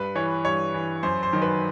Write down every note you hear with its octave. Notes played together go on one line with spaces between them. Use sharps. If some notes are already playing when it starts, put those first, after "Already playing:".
Already playing: G2 B4
E3 C#5
G2 C#5
E3
F#2 C5
C5
D#3 F#3
B4